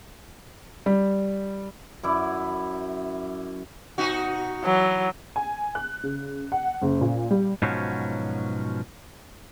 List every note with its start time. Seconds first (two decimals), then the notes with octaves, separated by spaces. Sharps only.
0.86 G3
2.03 F#2 E4 D5
3.98 B2 D#4 F#4
4.65 E3 F#3
5.36 G#5
5.75 F#6
6.03 C#3
6.52 F#5
6.82 F#1
7.01 A#2
7.31 G3
7.62 G#2 B2 F3 F#3 C#4